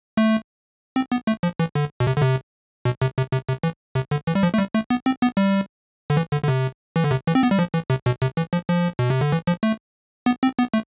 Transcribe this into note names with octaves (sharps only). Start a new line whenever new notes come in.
A3
C4
B3
A3
F3
E3
D3
B2
C3
D3
C3
B2
C3
C3
C3
C3
E3
C3
D3
E3
G3
F3
A3
G3
A3
B3
C4
B3
G3
D3
E3
D3
D3
C3
E3
D3
C3
E3
C4
B3
G3
F3
E3
C3
B2
C3
E3
F3
F3
B2
C3
D3
E3
F3
A3
B3
C4
B3
A3